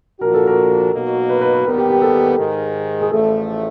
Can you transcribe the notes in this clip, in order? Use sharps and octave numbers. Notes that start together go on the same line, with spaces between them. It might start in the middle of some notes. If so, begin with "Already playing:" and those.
A#2 F3 A#3 D4 F#4 A#4
A4
A#4
B2 F#3 A#3 D#4 F#4
B4
B4
B4
D#2 D#3 G3 B3 A#4
G4
G4
A4
G#2 D#3 G#3 A#4
G#4
A1 A2 F3 A3 A4